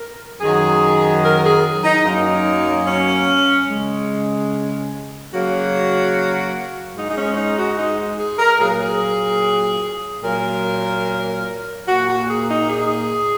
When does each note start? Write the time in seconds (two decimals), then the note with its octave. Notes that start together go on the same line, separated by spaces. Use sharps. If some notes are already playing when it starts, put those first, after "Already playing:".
Already playing: A#4
0.41 F#2 D#3 F#3 G#4
1.22 A#4
1.43 G#4
1.84 D#4
2.05 F#2 F#3 A#3 D#4
2.87 C#4
3.68 C#3 G#3
5.31 C#3 F#3 A#3 F#4
6.95 G#2 G#3 D#4
7.09 D#4
7.16 C#4
7.36 D#4
7.56 F#4
7.77 D#4
8.18 G#4
8.39 A#4
8.59 A#2 F#3 A#3 G#4
8.70 A#4
8.81 G#4
10.22 A#2 F#3 A#3 A#4
11.86 A#2 A#3 F#4
12.06 F#4
12.27 G#4
12.48 D#4
12.68 G#4